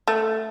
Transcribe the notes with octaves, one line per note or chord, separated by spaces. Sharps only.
A3